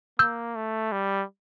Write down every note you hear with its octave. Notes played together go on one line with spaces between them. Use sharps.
A#3 E6 G6
A3
G3